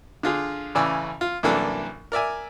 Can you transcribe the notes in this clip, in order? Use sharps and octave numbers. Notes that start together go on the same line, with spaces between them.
D3 F4 G#4
A1 C#3 E3 D5 G#5 E6
F4
C2 F#2 E3 A#3 D4 A4
A#4 D5 E5 G#5